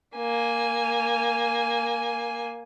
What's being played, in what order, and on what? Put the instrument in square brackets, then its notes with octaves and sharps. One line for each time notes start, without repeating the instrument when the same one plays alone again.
[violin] A#3 G#5